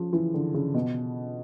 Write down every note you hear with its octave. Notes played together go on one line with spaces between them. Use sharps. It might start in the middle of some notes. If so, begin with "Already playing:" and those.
Already playing: C#3 F3
E3
D3
C#3
B2